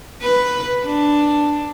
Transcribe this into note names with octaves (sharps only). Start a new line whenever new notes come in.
B4
D4